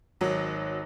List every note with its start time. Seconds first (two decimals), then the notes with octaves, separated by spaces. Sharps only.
0.21 G#1 F#3